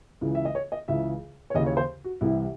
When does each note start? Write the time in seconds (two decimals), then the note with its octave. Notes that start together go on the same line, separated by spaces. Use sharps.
0.21 C#2 C#3 E3
0.35 E5
0.45 D#5
0.55 C#5
0.72 D#5
0.88 C#2 C#3 E3 E5
1.50 C#5
1.54 D#2 C#3 E3 D#5
1.66 C#5
1.77 C5
2.04 F#4
2.21 C2 C3 E3 E4